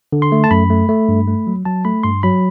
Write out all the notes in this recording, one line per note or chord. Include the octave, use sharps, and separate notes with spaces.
D3
C6
A3
A5
F#2 B5
A3
A3
G2
A3
F#3
F#3 A5
A3 B5
G2 C6
F#3 B5